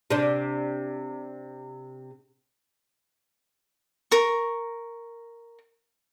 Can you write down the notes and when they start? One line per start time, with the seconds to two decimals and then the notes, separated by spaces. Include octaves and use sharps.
0.10 C3 D4
4.11 A#4 C#6